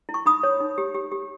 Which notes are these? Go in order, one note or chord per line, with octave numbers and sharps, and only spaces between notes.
E4
C#6
D#4 B5 D#6
C#5
D#4
G4
G4
G4